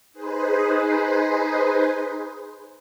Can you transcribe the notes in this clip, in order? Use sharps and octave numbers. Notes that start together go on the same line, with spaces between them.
D#4 G#4 B4 C5